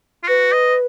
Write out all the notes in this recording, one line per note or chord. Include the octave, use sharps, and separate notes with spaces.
F4
F#4 B4
D#5